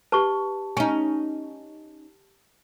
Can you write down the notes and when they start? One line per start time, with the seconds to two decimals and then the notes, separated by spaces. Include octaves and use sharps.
0.12 G4 B4 A5 C#6
0.77 C#4 D#4 G#5